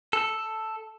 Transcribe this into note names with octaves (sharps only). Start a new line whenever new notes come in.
A4